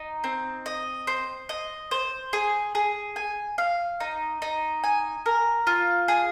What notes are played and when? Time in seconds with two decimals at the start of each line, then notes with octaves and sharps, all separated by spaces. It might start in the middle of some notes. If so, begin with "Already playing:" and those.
Already playing: D#4
0.24 C4
0.66 D#5
1.07 C5
1.49 D#5
1.91 C5
2.33 G#4
2.75 G#4
3.16 G#5
3.58 F5
4.00 D#4
4.42 D#4
4.84 G#5
5.26 A#4
5.67 F4
6.08 G#4